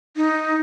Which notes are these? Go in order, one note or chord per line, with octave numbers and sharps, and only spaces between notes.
D#4